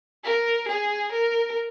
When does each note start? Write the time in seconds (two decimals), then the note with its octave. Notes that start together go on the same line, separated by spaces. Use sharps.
0.24 A#4
0.69 G#4
1.12 A#4